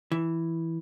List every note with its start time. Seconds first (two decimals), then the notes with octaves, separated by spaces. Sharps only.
0.12 E3